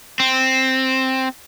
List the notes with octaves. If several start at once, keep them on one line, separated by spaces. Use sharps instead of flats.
C4